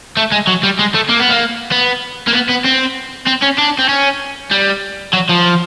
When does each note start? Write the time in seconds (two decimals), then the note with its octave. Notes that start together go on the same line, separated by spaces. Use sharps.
0.17 A3
0.32 G#3
0.47 F#3
0.63 G3
0.79 G#3
0.95 A3
1.09 A#3
1.20 B3
1.30 A#3
1.72 B3
2.28 A#3
2.33 B3
2.49 B3
2.65 C4
3.27 C4
3.42 C#4
3.58 D4
3.79 C4
3.89 C#4
4.51 G3
5.13 F#3
5.29 F3